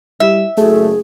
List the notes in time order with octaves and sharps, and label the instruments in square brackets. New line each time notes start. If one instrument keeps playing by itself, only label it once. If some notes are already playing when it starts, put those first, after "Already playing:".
[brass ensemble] G3 E4 G4 [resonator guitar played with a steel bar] E5
[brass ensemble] F#1 [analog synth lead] A3 [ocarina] G#4